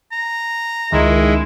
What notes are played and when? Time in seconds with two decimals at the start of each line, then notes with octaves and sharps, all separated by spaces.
0.12 A#5
0.92 C#2 D#3 G#3 E4